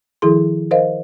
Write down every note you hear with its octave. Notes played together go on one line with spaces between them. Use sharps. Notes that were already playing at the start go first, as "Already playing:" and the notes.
D#3 F3 E4 G#4 A4 C6
A#4 C5 D#5 F5